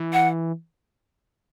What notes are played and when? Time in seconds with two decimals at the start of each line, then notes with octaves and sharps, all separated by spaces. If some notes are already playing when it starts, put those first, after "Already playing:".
Already playing: E3
0.13 F#5